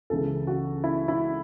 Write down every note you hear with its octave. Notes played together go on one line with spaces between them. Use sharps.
C#2 C#3 E3 A4
F#4
E4
E4